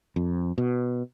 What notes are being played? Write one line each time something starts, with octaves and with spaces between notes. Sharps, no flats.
F2
B2